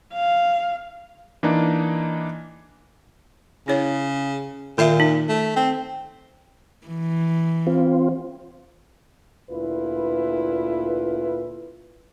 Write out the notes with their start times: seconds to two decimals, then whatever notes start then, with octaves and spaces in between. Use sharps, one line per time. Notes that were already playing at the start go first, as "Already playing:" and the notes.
0.13 F5
1.43 E3 A#3 D4 D#4
3.68 C#3 E4 C#5
4.78 A#2 D#3 E5
5.00 D#4
5.29 A3
5.56 C4
6.87 E3
7.67 C4 F4
9.50 D2 A#2 E4 F4 B4